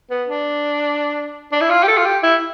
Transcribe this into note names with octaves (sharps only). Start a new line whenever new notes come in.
B3
D4
D4
E4
F4
G4
A4
F4
G4
E4